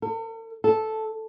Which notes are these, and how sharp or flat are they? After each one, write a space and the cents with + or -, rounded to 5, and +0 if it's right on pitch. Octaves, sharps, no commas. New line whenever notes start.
A4 +45
A4 -5